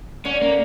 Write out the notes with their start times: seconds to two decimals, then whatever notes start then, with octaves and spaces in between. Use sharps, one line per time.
0.25 D3 C#4
0.42 A#3